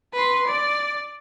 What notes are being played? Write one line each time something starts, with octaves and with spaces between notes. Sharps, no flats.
B4 C6
D5